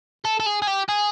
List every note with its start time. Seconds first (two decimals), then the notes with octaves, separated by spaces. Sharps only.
0.25 A4
0.40 A4
0.46 G#4
0.62 G#4
0.67 G4
0.89 G#4